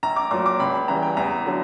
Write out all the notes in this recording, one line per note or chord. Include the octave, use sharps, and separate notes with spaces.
A#1 A#5
D6
A#2 F#3 D6
D6
C#2 B5
B5
C#3 E3 G3 A#5
G5
E2 A#5
D3 F#3